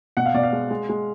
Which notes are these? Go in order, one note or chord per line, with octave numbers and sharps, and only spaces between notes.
B2 F#5
F5
B2 D5
F5
G#3
G#3
G#3